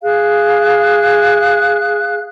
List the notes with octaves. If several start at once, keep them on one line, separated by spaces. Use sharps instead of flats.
G#4 F5 F#6